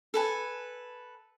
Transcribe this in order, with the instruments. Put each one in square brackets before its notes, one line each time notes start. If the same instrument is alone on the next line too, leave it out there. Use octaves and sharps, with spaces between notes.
[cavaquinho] A4 B4 G#5